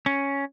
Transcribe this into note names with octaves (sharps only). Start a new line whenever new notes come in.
C#4